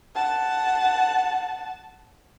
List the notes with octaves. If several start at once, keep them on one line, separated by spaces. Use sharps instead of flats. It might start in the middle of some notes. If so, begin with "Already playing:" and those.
F#5 A5